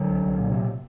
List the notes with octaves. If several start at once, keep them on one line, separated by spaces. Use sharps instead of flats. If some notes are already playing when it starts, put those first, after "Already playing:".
Already playing: D3 F#3
C2
C2
A#2
C3